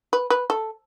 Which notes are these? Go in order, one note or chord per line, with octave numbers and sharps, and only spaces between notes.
B4
B4
A4